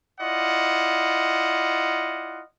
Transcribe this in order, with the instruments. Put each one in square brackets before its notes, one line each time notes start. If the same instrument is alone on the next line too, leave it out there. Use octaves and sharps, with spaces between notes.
[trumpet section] E4 F4 D5 D#5 F#5